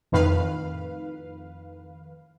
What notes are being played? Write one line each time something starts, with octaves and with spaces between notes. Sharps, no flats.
F2 A2 D#3 B4 F5